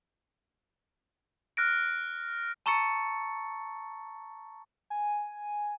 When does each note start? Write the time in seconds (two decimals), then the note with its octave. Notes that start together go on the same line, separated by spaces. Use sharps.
1.57 F6 F#6 A#6 D7
2.66 A5 A#5 C#6 E6 A6 C#7
4.90 G#5